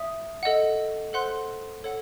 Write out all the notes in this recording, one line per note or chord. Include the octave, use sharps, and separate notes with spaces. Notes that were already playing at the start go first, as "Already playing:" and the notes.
Already playing: E5 D#6
A4 D#5 F#5
A4 C5 F#5 C6 F#6
A4 C#5 F#5